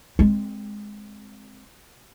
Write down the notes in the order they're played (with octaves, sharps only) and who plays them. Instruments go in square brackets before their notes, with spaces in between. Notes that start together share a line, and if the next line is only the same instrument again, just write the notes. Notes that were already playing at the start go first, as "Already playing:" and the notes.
[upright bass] G#3 C4